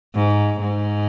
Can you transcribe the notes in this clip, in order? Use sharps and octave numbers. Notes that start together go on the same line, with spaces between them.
G#2
G#2